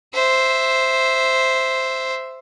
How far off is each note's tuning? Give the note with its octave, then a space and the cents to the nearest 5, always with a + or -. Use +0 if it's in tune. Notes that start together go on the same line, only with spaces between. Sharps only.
C5 +0 E5 +0